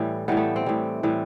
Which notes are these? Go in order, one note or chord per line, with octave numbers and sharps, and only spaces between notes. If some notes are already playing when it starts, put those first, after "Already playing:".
Already playing: A2 E3 G3
A2 E3 G3 B3
A3
C4
A2 E3 G3
A2 E3 G3